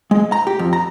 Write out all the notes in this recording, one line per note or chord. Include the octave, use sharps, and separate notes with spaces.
G#3
A#5
G4
F2
A#5